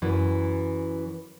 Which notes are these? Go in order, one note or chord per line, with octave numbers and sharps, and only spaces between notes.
F#2 E3